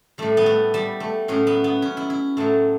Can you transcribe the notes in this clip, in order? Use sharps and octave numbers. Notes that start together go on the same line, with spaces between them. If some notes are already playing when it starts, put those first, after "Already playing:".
A2 G3 A3
B3
A3
G3
A3
A2 F#3 C#4
B3
B3
C#4
E4
E4
A2 F#3 A3